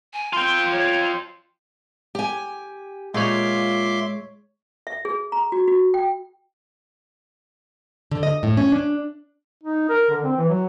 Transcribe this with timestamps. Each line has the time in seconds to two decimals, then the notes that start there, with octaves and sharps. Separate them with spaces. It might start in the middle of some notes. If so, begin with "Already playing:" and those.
0.14 G#5
0.33 F4 G5 C6
0.71 C#5
2.15 G4 G#5
3.14 A#2 G#3 F4 C#5 E5 C6 D6
4.87 E5
5.05 G#4
5.32 A#5
5.52 F#4
5.68 F#4
5.94 G5
8.11 D3
8.23 D#5
8.43 A2
8.57 C#4
8.72 D4
9.63 D#4
9.89 A#4
10.10 D3
10.24 C4
10.36 E3
10.49 F#3